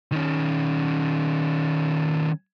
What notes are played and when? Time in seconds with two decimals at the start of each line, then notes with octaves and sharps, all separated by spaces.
0.12 D#3 C#4